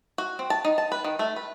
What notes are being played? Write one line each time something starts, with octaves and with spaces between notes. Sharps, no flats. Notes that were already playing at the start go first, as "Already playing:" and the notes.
F#4
C4
A5
D#4
A5
B4
D#3
A3
B4